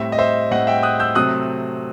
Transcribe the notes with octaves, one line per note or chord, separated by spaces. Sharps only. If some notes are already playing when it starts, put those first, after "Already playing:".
Already playing: A2 G3 C4 E5
D#5
C5 E5
A2 G3 C4 D#5 F#5
E5 G5
D#6 F#6
E6 G6
C3 F#3 A3 C4 D#6 F#6